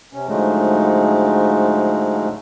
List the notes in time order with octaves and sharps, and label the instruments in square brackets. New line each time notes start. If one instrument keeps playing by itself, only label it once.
[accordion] C3 C#4
G#2 D3 F3 F#3 G#3 A3